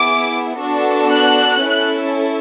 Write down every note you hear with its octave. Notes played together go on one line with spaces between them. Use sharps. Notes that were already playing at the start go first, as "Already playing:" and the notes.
Already playing: B3 E4 G#4 D6
B3 D4 F#4 A4
F#6
C#4 E4 A4